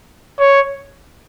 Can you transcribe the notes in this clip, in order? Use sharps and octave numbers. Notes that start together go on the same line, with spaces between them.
C#5